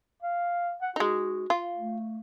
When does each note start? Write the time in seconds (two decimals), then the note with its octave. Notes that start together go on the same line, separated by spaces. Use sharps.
0.23 F5
0.82 F#5
0.96 G#3 D#4 F#4
1.50 F4
1.76 A3